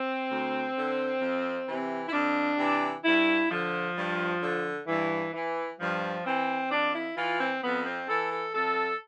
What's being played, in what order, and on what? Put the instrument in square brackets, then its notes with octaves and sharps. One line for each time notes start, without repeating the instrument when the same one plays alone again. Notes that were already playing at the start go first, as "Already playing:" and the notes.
Already playing: [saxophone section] C4
D2
D3
F2
C3 E3
E4
F2 D4
C3 E3
G2 E4
D3 F3
G2
D3
G2 E3
E3
G2 F3
E3 C4
F2 D4
E4
E3 F4
C4
F2 B3
C4
E3 A4
A4
F2 A4